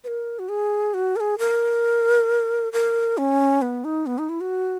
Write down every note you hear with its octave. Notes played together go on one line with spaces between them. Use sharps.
B4
A#4
F#4
G#4
F#4
A#4
G#4
A#4
A#4
C#4
B3
D#4
B3
D#4
E4
F#4